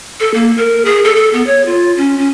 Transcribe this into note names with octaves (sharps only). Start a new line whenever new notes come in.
A4
A#3
A#4
G#4
A4
A4
B3
C#5
F4
C#4
C#4